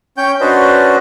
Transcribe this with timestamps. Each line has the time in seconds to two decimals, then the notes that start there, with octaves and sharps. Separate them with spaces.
0.17 C#4 C#5 G5 G6
0.41 C#4 D4 F#4 B4 C5 D#5